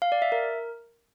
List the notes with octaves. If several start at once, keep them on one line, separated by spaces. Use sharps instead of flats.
F5
D5
E5
A#4